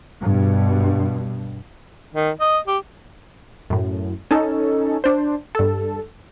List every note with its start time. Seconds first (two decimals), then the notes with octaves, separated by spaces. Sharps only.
0.23 G2 B2
2.14 D#3
2.41 D#5
2.68 G4
3.70 F#2 A2
4.31 C#4 D#4 A4
5.04 D4 C5
5.55 G2 A4